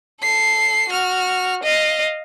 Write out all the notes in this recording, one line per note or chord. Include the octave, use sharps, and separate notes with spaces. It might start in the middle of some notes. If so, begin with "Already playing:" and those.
A4 C7
F#4 F6
D#5 F5